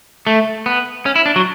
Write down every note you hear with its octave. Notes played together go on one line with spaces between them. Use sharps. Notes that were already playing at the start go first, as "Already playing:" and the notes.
A3
B3
C#4
E4
D4
F#3